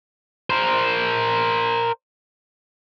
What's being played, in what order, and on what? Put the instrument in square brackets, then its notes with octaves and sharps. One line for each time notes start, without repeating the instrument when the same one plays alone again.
[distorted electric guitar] A#4 C5